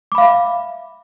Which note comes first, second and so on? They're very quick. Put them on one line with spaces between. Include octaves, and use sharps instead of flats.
D6 B5 F5 E5